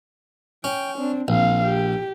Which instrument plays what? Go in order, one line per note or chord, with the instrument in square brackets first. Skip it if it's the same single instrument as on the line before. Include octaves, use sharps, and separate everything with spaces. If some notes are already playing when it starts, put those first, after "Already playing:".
[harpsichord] C#4 [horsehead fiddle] G5
[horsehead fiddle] C4 D4
[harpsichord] A#1 [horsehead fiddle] C4 F5
[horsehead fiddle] G4